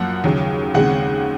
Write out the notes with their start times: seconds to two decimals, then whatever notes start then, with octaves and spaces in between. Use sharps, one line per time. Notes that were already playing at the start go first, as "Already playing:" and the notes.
Already playing: F#2 F3 A#3 F#5
0.24 D#2 C#3 F#3
0.74 D#2 C#3 G#3 C4 F#5